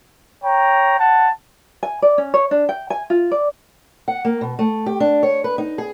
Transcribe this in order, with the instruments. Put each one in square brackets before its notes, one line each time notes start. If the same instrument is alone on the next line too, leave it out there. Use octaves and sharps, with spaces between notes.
[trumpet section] C#5 G5 A#5
F#5 A5
[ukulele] G#5
D5
C#4
C#5
D4
G5
G#5
F4
D5
[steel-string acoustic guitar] F#5
A#3
B2
A3
G4
D4
C#5
B4
D#4
G#4